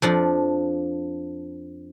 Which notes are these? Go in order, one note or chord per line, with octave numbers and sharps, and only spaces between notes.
F2 F3 D4